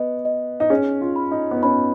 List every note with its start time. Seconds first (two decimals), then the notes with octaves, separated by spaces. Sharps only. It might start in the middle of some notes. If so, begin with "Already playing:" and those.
Already playing: B3 D#5
0.25 D#5
0.60 D#4
0.70 C#4 G#4
1.01 F4
1.16 B5
1.31 D#4
1.51 B3
1.63 C#4 B5